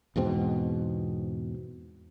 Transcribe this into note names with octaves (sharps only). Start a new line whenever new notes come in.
E2 G#2 B2 C4